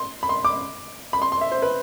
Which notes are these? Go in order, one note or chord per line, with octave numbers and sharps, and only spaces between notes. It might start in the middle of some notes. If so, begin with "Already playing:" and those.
Already playing: C6
B5
C6
D6
B5
C6
C6
E5
C5
B4